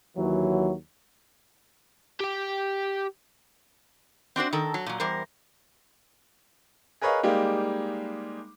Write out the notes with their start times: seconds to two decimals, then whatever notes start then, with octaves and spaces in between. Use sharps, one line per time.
0.16 D#2 E3 F#3
2.20 G4 G5
4.36 C4 D4 F#4 C5
4.53 D#3 A4 A#4
4.74 F#3
4.86 A#2 F#3
5.00 E2 G3 A#4 C5
7.01 G#4 A#4 B4 C#5 D#5 F5
7.23 G3 G#3 A#3 D#4 G4